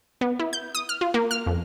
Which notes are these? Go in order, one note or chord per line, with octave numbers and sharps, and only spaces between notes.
B3
E4
G6
D#6
F6
F4
A#3
F6
F2